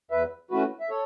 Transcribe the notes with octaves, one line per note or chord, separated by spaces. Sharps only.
E2 B4 E5
E3 A3 C#4 F#4 B4
E5
A4 C#5